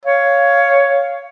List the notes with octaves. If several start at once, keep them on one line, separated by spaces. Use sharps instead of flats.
C#5 F5